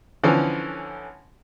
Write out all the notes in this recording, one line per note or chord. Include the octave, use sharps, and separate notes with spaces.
D3 E3 F3 C#4